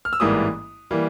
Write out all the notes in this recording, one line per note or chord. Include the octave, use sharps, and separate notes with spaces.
F6
E6
A1 G#2 E3 G3 A#3 D#6
E3 G3 A#3